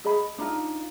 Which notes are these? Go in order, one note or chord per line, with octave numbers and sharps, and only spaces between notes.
G#4 D#5 B5
D4 D#4 F4